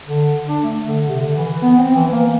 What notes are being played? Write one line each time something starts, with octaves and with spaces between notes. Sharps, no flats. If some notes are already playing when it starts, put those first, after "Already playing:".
D3
D4
A3
D3
C3
D3
E3
B3
C4
E3
A#3